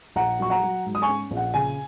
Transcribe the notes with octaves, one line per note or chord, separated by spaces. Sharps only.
A#1 F#5 A#5
F#3 C#6
F#5 A#5
F#3
G#2
D#6
G#5 C#6
C#4
A#1
F#5
C#3 G#5